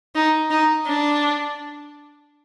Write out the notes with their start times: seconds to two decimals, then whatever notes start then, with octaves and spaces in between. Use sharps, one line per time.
0.15 D#4
0.51 D#4
0.87 D4